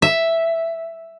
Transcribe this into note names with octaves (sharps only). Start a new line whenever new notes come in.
E5